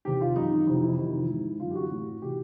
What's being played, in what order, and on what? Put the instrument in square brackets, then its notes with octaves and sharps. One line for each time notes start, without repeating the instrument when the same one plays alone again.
[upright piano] E2 C3 D#3 G4
F4
F#2 D#3 D#4
F2 C3 E3 D#4
E4
F2 C3 D#3
G#2 E3
F#2 D3 F4
G4
F#4
A2 E3
C3 E3 G4